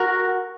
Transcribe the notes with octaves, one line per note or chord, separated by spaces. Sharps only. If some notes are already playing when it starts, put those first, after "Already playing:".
Already playing: F#4 A#4